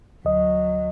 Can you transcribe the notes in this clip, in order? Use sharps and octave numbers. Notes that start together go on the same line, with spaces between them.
D2 F#3 D#5